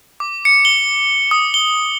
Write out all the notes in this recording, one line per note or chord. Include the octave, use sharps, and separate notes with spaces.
D6
C#7
G7
D#6
G7